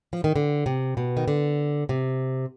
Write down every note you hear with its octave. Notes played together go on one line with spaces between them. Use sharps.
F3
D#3
D3
C3
B2
D#3
D3
C3